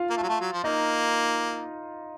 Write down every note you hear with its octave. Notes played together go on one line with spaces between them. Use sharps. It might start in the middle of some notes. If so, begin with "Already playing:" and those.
Already playing: F4 F5
A#3
A3
F#3
A3
F#3
F3
A#3 D#4 D#5